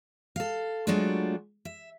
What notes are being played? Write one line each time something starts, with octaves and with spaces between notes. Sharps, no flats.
A4 F5
F#3 G#3 A3 D4 F4 F#4
E5